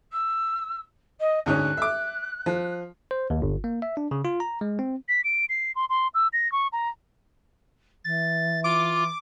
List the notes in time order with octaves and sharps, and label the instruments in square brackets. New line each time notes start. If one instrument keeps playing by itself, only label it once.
[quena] E6
D#5
[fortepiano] D2 G#2 C#4 [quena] F#6
[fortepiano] E5 D6
F3
[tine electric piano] C5
D#2
G1
A#3
E5
D4
C#3
F4
A#5
G#3
C4
[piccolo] B6
D7
C7
C6
C6
E6
A#6
C#6
A#5
[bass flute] E3 [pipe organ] A6
[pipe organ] F4 [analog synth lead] D6